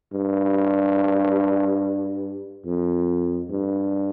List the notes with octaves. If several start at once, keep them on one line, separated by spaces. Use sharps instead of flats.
G2
F2
G2